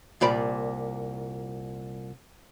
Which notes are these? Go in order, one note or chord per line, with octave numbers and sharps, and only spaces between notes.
C2 A#2 D5 B5